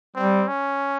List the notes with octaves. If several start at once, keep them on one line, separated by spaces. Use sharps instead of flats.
G3 C4
C#4